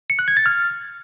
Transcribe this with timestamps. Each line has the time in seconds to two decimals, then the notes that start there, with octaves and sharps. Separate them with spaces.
0.10 C#7
0.19 F#6
0.28 G#6
0.37 A6
0.46 F6